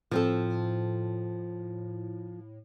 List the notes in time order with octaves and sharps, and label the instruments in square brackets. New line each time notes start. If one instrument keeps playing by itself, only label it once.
[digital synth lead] A2 [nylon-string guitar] F3 C4 A4